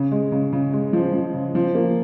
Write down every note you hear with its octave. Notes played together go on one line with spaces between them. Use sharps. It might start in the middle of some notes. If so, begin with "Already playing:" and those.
Already playing: C#3
G#3
C#3
C#3
G#3
F3
F3
C#3
F3
A#3